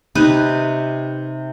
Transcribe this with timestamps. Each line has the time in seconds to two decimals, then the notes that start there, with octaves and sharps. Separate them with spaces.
0.15 C3 D#4 B4 B5